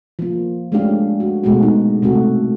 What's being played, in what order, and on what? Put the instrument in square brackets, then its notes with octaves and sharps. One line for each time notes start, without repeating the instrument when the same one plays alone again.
[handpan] F3 A#3
G#3 A3 C#4 D4 G4 F5
F#4
B2 G#3 A3 F#4
D#4
C3 A3 F#4